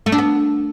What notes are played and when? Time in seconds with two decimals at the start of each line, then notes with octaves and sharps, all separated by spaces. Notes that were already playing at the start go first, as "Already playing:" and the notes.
0.06 A3
0.12 D4
0.18 B3